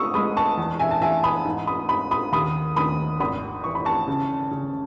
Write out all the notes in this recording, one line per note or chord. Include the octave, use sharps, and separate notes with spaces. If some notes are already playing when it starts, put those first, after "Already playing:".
Already playing: G#3 C#6 D#6 E6
G#3 B5 D#6
A5 C#6
E2
E5 G#5
A5
E2 E5 G#5
B5 D#6
G#2
B5 D#6
G#2 B5 D#6
B5 D#6
D#2 B5 D#6
D#2 B5 D#6
G#1 B5 D#6
E3 C#6
B5
A5 C#6
C#3
C#3